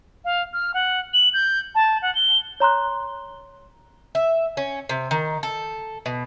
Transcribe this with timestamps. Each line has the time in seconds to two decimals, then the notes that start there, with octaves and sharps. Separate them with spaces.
0.25 F5
0.53 F6
0.74 F#5
1.14 F#7
1.34 G6
1.75 A5
2.02 F#5
2.15 G7
2.60 C#5 A#5 C6 F#6
4.15 E5
4.57 C#4
4.89 C3
5.11 D#3
5.43 A4
6.06 B2